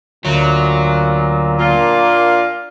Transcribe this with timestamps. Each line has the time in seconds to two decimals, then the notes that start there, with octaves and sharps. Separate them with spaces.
0.25 D2 A#2 F#3
1.59 A#3 D4 F4